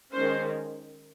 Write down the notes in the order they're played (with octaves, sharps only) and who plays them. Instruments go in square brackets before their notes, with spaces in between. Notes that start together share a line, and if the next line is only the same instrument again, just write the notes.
[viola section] D#3 G#3 C#4 C5